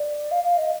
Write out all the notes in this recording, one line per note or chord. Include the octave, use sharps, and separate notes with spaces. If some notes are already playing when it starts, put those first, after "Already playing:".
Already playing: D5
F5
F5
D#5